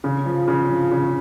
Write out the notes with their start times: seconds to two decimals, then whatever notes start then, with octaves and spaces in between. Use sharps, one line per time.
0.04 C#3
0.26 F3
0.48 C#3
0.70 F3
0.91 C#3